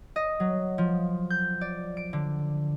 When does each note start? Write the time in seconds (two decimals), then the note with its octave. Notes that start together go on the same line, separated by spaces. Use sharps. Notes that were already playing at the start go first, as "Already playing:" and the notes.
0.16 D#5
0.40 F#3
0.78 F3
1.30 G6
1.61 D5
1.97 D7
2.13 D3